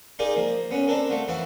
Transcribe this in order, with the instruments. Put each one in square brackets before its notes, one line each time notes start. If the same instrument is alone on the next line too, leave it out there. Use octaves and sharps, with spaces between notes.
[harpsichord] D#4 F4 G4 G#4 A#4 D5
F3 A#3
B3 C#4 F#4
C4 D4 A4 A#4
A3 F4 F#4
F2 E3 E4 F#4 F5